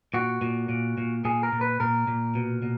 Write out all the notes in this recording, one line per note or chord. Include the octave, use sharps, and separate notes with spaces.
A#2 F#4
A#2
A#2
A#2
A#2 G#4
A#4
A#2
B4
A#2 A#4
A#2
B2
B2